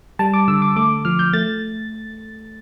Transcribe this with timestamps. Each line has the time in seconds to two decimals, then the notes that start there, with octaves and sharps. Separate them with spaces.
0.19 G3 A5
0.34 D6
0.48 D3 E6
0.62 D6
0.76 A3 D6
1.05 F3 F6
1.19 G6
1.33 A3 A6